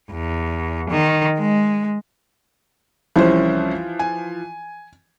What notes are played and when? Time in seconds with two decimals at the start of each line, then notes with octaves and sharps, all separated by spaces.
0.11 E2
0.91 D#3
1.39 G#3
3.16 C2 E3 F3 C#4 C5
3.99 G#5